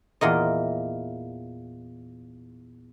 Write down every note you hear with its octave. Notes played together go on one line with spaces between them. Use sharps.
E2 A#2 A#4 D#5